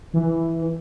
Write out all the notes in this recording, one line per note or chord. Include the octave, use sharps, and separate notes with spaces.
E3